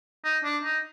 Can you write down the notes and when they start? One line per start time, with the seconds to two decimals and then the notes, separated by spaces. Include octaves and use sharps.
0.24 D#4
0.44 D4
0.64 D#4